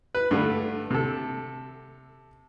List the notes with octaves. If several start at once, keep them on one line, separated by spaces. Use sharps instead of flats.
B4
G2 D3 A3
C3 A4